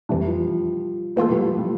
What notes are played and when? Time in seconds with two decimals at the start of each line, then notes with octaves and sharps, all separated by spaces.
0.09 F2 E3 G3 A3 D4
0.27 F3
1.16 E3 A3 A#3 F4 A4
1.30 G3
1.44 F3
1.58 G3